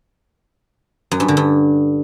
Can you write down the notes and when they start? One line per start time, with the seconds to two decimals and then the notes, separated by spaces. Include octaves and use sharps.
1.11 F#2
1.20 G2
1.28 D3
1.37 G2